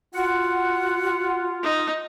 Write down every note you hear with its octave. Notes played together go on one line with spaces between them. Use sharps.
F4 F#4 F#5
D#4